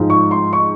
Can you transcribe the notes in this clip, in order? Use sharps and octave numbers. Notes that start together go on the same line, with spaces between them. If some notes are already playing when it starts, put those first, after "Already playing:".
Already playing: G#2 F3 G#3
C#6
C6
C#6